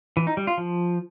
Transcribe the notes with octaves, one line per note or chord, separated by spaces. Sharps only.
E3
D#4
G3
F4
F3